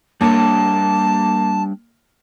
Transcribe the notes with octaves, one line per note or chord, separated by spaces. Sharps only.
G3 A#3 D4 C#5 A5